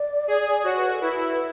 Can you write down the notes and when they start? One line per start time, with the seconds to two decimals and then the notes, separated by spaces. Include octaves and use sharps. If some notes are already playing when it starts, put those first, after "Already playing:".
Already playing: D5
0.28 G#4
0.64 F#4 C#5
0.76 B4
0.89 A4
1.01 E4 B4